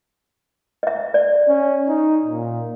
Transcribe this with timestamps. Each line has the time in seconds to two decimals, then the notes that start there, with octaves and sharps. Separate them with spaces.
0.83 D#5 E5
1.14 D5
1.48 C#4
1.88 D#4
2.25 A#2